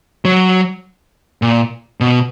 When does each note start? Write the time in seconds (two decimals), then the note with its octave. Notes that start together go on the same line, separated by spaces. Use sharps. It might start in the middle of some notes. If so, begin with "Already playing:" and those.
0.25 F#3
1.42 A#2
2.01 B2